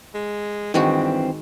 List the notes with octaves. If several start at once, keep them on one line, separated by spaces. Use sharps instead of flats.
G#3
G2 D#3 E3 G#3 C4 F#4